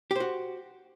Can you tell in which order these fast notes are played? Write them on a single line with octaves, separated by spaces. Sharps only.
G4 C5 F#4